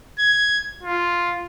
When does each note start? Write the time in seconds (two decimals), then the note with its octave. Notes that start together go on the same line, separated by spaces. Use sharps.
0.19 G#6
0.83 F4